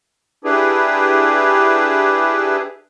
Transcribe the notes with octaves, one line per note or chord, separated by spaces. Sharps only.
D4 E4 G4 G#4 B4